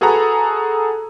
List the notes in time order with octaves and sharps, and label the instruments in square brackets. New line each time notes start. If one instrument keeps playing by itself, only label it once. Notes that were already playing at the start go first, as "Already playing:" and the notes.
[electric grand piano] F#4 G#4 A4 B4 F#5 A#5